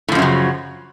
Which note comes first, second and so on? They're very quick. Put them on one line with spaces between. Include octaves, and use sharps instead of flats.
A2 F3 F#2 F#3 C#3